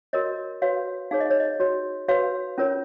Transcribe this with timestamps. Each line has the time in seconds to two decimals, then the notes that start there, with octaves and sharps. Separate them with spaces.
0.13 F#4 A#4 C#5 D#5
0.62 F#4 B4 C#5 F5
1.11 D#4 G#4 C#5 F5
1.20 D#5
1.30 C#5
1.40 D#5
1.60 F#4 C#5
2.08 F#4 B4 C#5 F5
2.58 C#4 F4 A#4 C#5